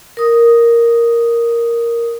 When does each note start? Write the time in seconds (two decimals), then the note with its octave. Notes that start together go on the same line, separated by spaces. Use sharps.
0.17 A#4 D#6